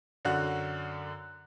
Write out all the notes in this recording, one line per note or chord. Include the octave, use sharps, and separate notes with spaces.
F#2 D3 F#4 F#6